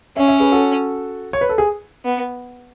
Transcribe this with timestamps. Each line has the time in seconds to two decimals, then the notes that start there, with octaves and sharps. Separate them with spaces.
0.17 C#4 C#5 E5
0.28 C#5 E5
0.40 G#4 B4
0.52 F#4 A4
1.33 C#5
1.41 B4
1.49 A4
1.58 G#4
2.05 B3